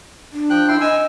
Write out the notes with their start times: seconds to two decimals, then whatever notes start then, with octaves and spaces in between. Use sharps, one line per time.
0.33 D4
0.50 F3 G5 F#6
0.68 E4 G5 C6
0.81 D#5 G#5 E6